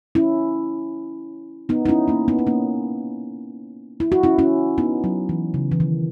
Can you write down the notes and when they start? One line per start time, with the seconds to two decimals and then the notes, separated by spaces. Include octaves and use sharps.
0.15 C#4 E4
1.69 B3 D#4
1.86 D#4
1.88 C#4 E4
2.08 A#3 C#4
2.28 B3 D#4
2.39 D#4
2.47 A#3 C#4
4.00 E4
4.12 F#4
4.23 C#4 E4
4.39 C#4 E4
4.78 B3 D#4
5.04 F#3
5.29 E3
5.54 C#3
5.72 E3
5.80 D#3